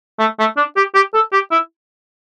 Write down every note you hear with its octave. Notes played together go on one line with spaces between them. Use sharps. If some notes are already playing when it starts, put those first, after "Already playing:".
A3
A3
D4
G4
G4
A4
G4
E4